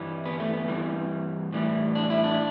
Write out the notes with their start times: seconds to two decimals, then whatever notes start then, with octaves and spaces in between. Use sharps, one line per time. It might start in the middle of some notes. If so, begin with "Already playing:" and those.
Already playing: G2 E3 G3
0.25 B3
0.40 A3
0.53 B3
0.68 G2 E3 G3
1.52 A2 E3 G3
1.95 D4
2.10 E4
2.24 D4